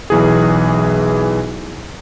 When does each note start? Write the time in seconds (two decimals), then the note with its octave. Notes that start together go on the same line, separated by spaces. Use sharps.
0.10 B1 E3 G#4